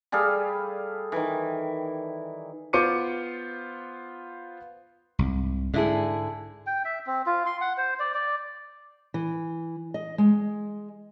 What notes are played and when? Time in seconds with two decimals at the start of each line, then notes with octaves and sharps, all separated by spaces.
0.12 G3 G#4 A4 F5
1.12 D#3 E3
2.73 B3 F4 C5 D6 C#7 D#7
5.19 C2 G#2
5.74 G#2 D3 E4 G#4
6.67 G5
6.85 E5
7.06 C4
7.26 F4
7.46 C6
7.61 F#5
7.78 C5
7.99 D5
8.14 D5
9.14 E3
9.94 D#5
10.18 G#3